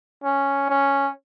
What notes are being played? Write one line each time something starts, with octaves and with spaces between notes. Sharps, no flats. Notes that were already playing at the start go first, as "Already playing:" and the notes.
C#4
C#4